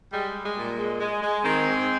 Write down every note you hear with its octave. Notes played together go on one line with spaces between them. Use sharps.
G3 G#3
G3
G#3
A#2
G#3
G#3
G#3
D#3 G#3 C4
G#2